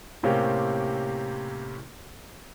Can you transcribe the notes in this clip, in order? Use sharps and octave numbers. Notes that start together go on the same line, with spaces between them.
A2 C3 A#3 C4 C#4 G4